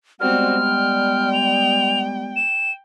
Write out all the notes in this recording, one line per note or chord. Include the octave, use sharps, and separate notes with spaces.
G3 G#3 B3 C4 F#4 F6
G5
F7
E7